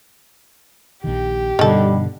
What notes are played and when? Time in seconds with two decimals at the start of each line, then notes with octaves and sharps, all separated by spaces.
1.04 A#1 D#3 G4
1.59 G2 B2 D3 D#3 G3 A4